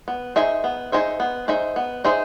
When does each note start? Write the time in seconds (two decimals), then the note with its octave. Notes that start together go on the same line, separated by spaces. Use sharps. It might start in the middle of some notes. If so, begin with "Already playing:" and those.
0.08 B3
0.36 D#4 G#4 C5 E5
0.64 B3
0.92 D#4 G#4 C5 E5
1.20 B3
1.48 D#4 G#4 C5 E5
1.76 B3
2.04 D#4 G#4 C5 E5